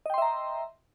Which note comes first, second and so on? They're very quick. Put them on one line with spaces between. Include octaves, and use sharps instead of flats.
D#5 G5 C6 E5 A#5